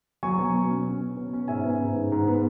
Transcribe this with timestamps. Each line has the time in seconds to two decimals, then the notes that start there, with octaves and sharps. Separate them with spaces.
0.23 F#3 G#5 C#6
0.38 B2
0.54 B2
0.70 C#4
0.86 C#4
1.01 C#4
1.17 B2
1.33 C#4
1.48 G#2 E5 G#5
1.65 B3
1.80 G#2
1.96 G#2
2.12 G#2
2.28 B3